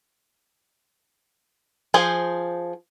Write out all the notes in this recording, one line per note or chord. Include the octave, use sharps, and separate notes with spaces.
F3 G#4 C5